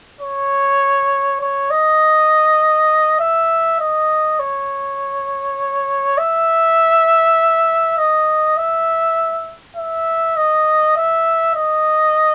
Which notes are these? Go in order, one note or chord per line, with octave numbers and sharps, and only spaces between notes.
C#5
C#5
D#5
E5
D#5
C#5
E5
D#5
E5
E5
D#5
E5
D#5